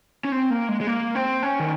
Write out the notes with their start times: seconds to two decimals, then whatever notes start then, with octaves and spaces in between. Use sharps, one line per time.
0.25 C#4
0.32 C4
0.50 A#3
0.69 G#3
0.81 G#3
0.87 A#3
1.15 C4
1.43 C#4
1.60 D#3